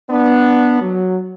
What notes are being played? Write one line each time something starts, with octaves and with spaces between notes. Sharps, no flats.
B3 D4
F#3